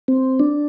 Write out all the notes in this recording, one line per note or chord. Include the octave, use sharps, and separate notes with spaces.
C4
D4